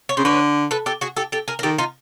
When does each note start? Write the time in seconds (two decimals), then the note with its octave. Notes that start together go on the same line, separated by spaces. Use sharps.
0.09 C#5
0.17 C#3 C5
0.24 D3 B4 C#5
0.71 A4 B4
0.86 G4 A4
1.01 F#4 G#4
1.17 G4 A4
1.32 G4 A4
1.48 G#4 A#4
1.59 A#4
1.63 D#3 G4 A4
1.78 D#4 F4